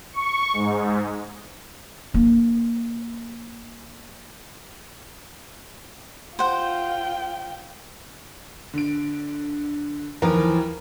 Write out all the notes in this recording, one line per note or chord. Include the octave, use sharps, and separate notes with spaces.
C#6
G#2
A#3 D4
F4 C5 F#5 G5
D3 D7
D#2 E3 F3 A#4